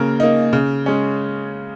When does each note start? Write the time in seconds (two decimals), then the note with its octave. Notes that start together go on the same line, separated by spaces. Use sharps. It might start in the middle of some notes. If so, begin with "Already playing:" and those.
Already playing: C#3 A#3 A#4
0.20 A#3 D#4
0.53 C#3
0.86 G#3 C#4